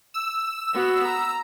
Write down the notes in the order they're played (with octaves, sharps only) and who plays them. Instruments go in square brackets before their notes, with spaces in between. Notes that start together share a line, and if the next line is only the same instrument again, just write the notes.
[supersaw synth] E6
[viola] B3 F#4
A#5